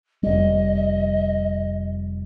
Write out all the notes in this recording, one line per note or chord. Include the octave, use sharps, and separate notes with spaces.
F1 G3 D#5